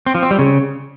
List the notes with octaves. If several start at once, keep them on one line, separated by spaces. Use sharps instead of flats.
C4
F3
C4
G3
C#3